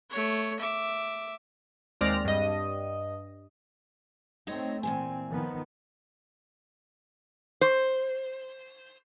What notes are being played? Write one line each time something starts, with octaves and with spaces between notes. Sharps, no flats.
A3 C#5
E5 D6
D#2 G#3 C4 D5 F6 A#6
G2 D#5
A3 C4 D#4 C#5 D#5
A#2 E3 C4 G#5
D#3 F3 B3
C5